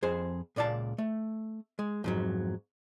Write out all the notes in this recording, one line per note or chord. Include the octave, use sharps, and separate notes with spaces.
F2 G#4 C5
C#2 A#2 D5 F5 A5
A3
G#3
F2 G#2 F#3